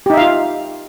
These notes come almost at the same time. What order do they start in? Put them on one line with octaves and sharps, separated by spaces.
G4 D#4 E5 F5 F4